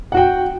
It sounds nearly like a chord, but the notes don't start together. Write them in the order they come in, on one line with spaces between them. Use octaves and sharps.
F#5 F#4 G5